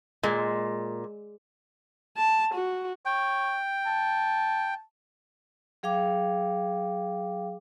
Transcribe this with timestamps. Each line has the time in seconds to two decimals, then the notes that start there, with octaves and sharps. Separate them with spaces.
0.23 A#2 G#3
2.17 A5
2.54 F#4
3.06 C#5 G5
3.86 A5
5.83 F#3 G#4 F5 G5 D6